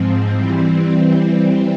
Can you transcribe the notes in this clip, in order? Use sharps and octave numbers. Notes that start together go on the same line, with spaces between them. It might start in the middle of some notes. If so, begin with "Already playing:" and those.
Already playing: G#2 F3 C4
E3 G3 C4